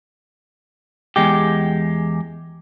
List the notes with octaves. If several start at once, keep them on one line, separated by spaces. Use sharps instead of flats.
E2 G#3 G4